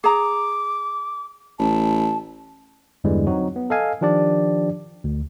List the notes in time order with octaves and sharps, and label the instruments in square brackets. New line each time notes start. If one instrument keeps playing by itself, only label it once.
[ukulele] G#4 A#5 [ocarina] D6
[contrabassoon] A1 [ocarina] A5
[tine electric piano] E2 G2 D3 E3 G3 G#3
F#3 C4 D#4 F#4
B3
A4 D#5 F5 G#5
D#3 F3 D4 G4 D5
D2